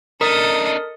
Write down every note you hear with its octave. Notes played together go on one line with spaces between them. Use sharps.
D4 D#4 A4 A#4 D#5 D#6